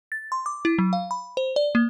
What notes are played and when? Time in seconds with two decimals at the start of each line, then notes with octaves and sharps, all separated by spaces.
0.12 A6
0.32 C6
0.46 D6
0.65 E4
0.78 F#3
0.93 F5
1.11 B5
1.37 C5
1.56 D5
1.75 A#3